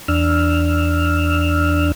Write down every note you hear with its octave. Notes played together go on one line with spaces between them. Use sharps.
E2 D4 E6 F6